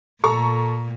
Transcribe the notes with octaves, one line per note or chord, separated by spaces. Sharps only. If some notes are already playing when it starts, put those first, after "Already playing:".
A#2 A4 A#5 C#6